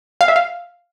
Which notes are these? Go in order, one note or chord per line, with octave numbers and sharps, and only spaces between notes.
F5
E5
F5